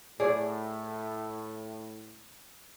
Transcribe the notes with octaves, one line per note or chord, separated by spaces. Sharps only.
A2 G#4 C#5 D5